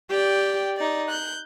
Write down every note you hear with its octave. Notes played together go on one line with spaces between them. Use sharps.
G4 D5 G5
D#4 D5
F#6 G6